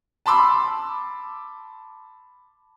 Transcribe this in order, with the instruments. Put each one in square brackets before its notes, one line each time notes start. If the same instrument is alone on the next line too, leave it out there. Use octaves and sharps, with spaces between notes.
[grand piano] A5 B5 C6 D6 E6